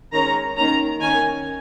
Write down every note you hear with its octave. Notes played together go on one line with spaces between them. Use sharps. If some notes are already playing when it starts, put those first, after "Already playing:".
D#3 G#3 C#4 A#5
D#3 A#3 C#4 A#5
D#3 C#4 G#5